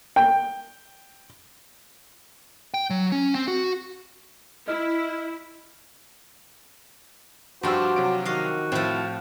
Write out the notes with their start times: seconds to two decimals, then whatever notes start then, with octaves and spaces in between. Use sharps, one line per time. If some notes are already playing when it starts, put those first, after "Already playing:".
0.16 G5
2.74 G5
2.90 F#3
3.12 C#4
3.35 C4
3.48 F#4
4.68 E4 D#5 F6
7.63 G2 F3 D4 F#4 G4 C5 E6
7.96 C3 F#3 D7
8.25 D#3 F#4 D#5 F5
8.72 A2 F3 C4 E4